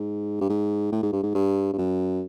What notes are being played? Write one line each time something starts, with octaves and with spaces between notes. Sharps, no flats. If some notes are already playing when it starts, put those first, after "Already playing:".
Already playing: G#2
G2
G#2
A2
G#2
G2
G#2
G2
G2
F#2